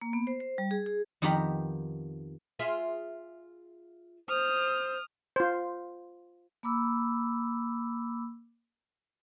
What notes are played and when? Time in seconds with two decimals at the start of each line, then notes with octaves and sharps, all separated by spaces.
0.02 A#3
0.13 B3
0.27 C5
0.40 C5
0.58 G3
0.71 G#4
0.86 G#4
1.22 F2 D#3 B3 G4 A#5 B5
2.59 F4 G#4 E5
4.29 C5 D#6 F6
5.36 F4 C5
6.63 A#3 B5 D6 E6